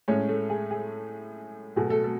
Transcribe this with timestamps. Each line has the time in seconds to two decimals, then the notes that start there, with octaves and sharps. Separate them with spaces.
0.08 A2 G#3 C#4 C#5
0.29 A3 A4
0.50 G#4
0.71 G#4
1.76 B2 F#3 A3 G#4
1.90 A3 A4
2.04 A3 A4